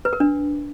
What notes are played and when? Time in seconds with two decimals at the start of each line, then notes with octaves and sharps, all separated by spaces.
0.05 B4
0.13 A#4
0.20 D4